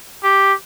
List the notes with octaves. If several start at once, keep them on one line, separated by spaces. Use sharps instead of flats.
G4